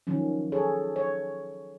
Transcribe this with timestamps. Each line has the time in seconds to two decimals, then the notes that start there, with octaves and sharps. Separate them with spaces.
0.07 D#3 F3 F#3 C#4
0.52 G#4 A4 C#5
0.96 C#5